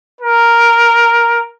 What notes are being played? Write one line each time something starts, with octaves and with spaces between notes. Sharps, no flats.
A#4